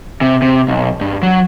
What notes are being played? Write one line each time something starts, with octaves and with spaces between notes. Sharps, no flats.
C3
C3
B1
G2
F#3